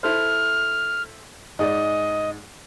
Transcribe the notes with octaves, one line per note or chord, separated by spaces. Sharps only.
E4 A4 C5 F6
G#2 G#4 D5 D#5